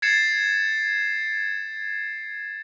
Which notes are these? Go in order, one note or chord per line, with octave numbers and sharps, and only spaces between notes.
G#6 A6 C7 C#7 E7